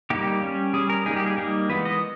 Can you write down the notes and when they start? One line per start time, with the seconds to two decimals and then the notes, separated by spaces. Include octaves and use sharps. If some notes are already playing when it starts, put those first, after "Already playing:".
0.10 G3 A#3 D#4 G4
0.42 G3 C#4
0.73 G3 C#4 G#4
0.90 A#4
1.06 G3 A#3 D#4 G#4
1.16 G4
1.27 G#4
1.38 G3 A#3 D#4
1.69 E3 G#3 B3 B4
1.85 D#5